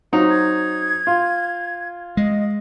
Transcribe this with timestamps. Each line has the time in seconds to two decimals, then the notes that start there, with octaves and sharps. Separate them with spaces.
0.13 F#3 C4 D#4 F4
0.29 G#6
1.07 F4
2.17 G#3 D#5